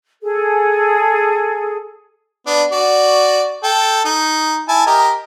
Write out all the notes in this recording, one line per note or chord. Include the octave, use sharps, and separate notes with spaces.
G#4 A4
B3 D4
F#4 D5
A4 G5
D#4
E4 G#5 A5
G4 A#4 D#5